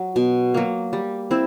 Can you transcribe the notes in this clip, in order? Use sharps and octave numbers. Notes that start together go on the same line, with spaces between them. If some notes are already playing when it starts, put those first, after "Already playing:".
Already playing: F#3
B2
F#3 A#3
G3
C4 E4